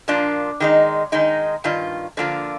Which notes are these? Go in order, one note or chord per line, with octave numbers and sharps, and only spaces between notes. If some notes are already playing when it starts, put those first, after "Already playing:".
A#2 F3 A#3 D4 F4
D#3 G#3 D#4
D#3 G#3 D#4
G2 D#3 F4
D3 F3 A#3 D4 F4